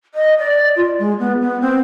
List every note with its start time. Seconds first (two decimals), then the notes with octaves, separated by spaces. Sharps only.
0.15 D#5
0.39 D5
0.76 F4
0.99 G#3
1.19 B3
1.42 B3
1.61 C4